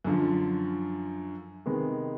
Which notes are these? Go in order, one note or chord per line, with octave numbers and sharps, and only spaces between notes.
F#2 D3 F3
C3 D#3 G#3 B3